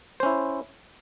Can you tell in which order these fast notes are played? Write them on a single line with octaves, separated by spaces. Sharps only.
C5 C#4 E4